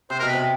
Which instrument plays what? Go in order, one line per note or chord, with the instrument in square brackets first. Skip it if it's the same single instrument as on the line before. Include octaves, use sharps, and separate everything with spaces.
[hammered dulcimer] C3 [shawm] C5
[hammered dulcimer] B2 [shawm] A#4
[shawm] B4
[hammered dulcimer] C3